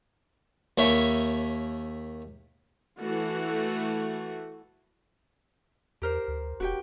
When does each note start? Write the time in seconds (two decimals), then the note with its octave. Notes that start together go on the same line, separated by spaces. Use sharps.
0.78 D#2 E4 C#5 E5
2.98 E3 A3 F#4
6.02 E2 G4 A#4 C5
6.28 D2
6.60 E1 F#4 G4 G5